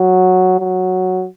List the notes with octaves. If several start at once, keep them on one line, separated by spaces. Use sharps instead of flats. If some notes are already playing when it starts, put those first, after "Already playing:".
Already playing: F#3
F#3